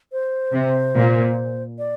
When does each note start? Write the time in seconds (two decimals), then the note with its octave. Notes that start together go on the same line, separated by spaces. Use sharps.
0.13 C5
0.53 C3
0.95 A#2
1.79 D5